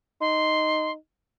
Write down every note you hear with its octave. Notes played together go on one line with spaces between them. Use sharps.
D#4 C6